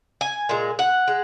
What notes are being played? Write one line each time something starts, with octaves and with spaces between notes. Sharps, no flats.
G#5
A#2 G#3
F#5
G#3